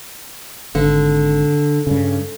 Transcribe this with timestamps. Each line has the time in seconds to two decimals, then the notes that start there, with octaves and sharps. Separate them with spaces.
0.75 G#1 D3
1.87 G2 C#3